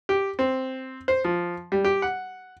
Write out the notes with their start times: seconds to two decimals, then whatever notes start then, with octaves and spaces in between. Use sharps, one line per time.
0.09 G4
0.39 C4
1.08 C5
1.25 F3
1.72 G3
1.84 G4
2.02 F#5